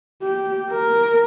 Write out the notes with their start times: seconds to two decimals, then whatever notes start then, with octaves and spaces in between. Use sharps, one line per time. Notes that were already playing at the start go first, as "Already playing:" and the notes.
0.23 G4
0.71 A#4